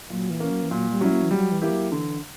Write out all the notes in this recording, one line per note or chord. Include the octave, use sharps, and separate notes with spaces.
A#2 F#3
E3
A#3 C#4
F#3
E3
A#2 F#3
G3
F#3 C#4 E4
A#3
E3
F#3 G3
E3
A#3 E4 G4
F#3
D3 E3